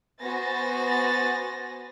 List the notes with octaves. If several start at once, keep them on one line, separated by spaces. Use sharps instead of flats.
B3 F#4 C5 G#5 A6 A#6